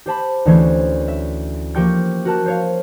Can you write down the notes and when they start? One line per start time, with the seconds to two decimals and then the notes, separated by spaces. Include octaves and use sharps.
0.06 G4 C5 A5 B5
0.46 D2 E3 C#4 C5 G#6
1.08 E5
1.75 F3 A#3 G4 G5 C#6 G6
2.25 F#4 A#4 A5 F#6
2.46 C5 C#5 F5